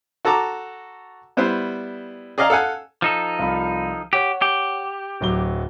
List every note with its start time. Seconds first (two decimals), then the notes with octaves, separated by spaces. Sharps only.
0.25 F#4 A4 A5 A#5 D6
1.37 G3 B3 E4 C5
2.38 G#4 D5 D#5 F5 G#5 A#5
2.50 A4 F5 F#5 G#5
3.02 F3 D#4 A4
3.39 C2 F4 B5
4.13 G4 C#5 F#5
4.42 G4
5.21 D1 F#3 G7